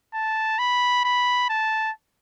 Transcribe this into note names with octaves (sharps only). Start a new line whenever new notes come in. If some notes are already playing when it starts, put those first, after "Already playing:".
A5
B5
B5
A5